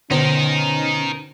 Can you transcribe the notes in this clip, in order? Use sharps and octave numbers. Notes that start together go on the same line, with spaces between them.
B2 D3 C#4 D#4 A#4 C5